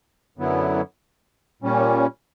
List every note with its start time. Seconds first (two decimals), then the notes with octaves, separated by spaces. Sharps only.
0.38 F#2 D3 F#3 B3 E4
1.62 A#2 G3 C#4